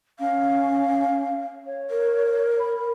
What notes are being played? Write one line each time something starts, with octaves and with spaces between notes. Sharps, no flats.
C#4 F5
C#5
A#4
B5